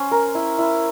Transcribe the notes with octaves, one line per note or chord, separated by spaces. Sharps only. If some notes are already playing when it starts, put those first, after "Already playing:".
Already playing: C#4 C5
A#4
E4
E4